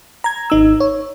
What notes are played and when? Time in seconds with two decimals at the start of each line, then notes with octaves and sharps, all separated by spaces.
0.24 A#5 G#6
0.50 G#1 D#4 E6
0.80 C#5